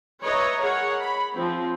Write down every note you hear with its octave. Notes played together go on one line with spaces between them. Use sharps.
B4 C#5 D#5 E5 A#5
G#4 A#4 C#5 F#5
B5
F3 C4